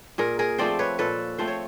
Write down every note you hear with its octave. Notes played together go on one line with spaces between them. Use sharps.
A#2 G#4 A#4
G#4 A#4
F3 A3 C4 C5 D5
B4 C#5
A#2 A4 B4
F3 A3 C4 C5
C#5